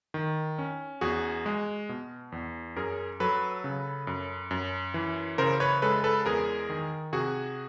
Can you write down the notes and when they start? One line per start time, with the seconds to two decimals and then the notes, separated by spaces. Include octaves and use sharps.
0.14 D#3
0.59 C#4
1.01 E2 F#4 G#4
1.46 G#3
1.89 B2
2.32 E2
2.76 F#2 G#4 A#4
3.20 F#3 A4 B4
3.64 C#3
4.07 F#2
4.51 F#2
4.94 E3
5.38 C#3 A#4 C5
5.60 B4 C#5
5.82 G#3 A4 B4
6.04 A4 B4
6.26 E2 G#4 A#4
6.70 D#3
7.13 C3 F#4 G#4